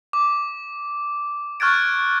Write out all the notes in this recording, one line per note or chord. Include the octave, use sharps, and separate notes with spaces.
D6
C#6 F6 F#6 G#6 A6 D7